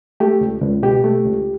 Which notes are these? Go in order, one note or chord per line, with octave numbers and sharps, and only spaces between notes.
A3 G4
C#2
C#2
B2 G4
A3
C#2